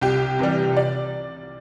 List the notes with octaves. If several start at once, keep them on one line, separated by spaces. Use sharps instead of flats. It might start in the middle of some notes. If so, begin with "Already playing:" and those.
C2 G4
C3 E3 G3
D5